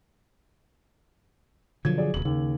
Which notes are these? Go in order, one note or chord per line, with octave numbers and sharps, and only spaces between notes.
B2 D3 F3 F#3 G#6
F#4 G#4 D5
D#1 B2 F#7
D#2 C#3